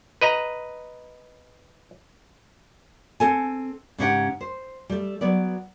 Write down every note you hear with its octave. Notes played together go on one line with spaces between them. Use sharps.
B4 D#5 A#5
C4 A4 G#5
G#2 C#3 C#4 G4 F#5 G5
C5
G3 A3
F#3 B3 D5